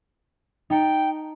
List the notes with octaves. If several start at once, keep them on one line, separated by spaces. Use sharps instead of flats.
D#4 G5 A5 C#7